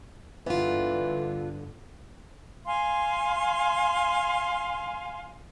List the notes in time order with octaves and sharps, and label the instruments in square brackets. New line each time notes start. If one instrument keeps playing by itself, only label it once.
[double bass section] G2 D3 [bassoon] E3 [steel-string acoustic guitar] B3 F4
[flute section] F5 G#5 C6